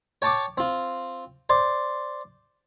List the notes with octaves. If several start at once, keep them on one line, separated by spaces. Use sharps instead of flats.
C#5 G5 A5 C#6 D6
C4 F4
C5 D5 C6